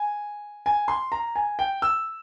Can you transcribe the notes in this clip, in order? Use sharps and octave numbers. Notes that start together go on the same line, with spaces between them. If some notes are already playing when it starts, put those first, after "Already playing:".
Already playing: G#5
G#5
C6
A#5
G#5
G5
E6